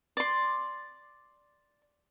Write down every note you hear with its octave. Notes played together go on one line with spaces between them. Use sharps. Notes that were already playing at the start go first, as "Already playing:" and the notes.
D5 C6